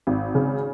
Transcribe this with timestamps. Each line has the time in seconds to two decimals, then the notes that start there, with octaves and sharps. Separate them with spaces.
0.07 G#1
0.35 C#3